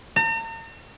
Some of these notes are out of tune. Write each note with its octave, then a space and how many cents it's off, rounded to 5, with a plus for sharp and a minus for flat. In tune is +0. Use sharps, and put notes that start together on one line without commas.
A#5 -45